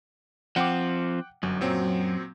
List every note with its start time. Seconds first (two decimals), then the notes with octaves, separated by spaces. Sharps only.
0.56 F3 C4 F#5 G5 D6
1.43 G1 F#2
1.61 A#2 F#3 C4